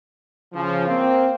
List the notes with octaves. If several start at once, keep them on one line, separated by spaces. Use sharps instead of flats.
C#3 F3
A#3 C4